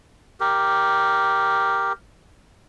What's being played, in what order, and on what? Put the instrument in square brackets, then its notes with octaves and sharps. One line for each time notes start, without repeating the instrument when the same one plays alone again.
[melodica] G4 A#4